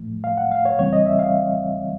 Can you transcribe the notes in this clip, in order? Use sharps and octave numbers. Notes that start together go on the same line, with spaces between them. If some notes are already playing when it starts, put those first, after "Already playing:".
Already playing: A2 F3 A3
F5
F#5
F5
C#5
E2 C#3 E3 G3 C4 C#5
D#5
E5
F5